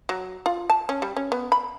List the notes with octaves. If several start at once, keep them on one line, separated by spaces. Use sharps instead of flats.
F#3
F4
A5
C#4
G3
C#4
B3
B5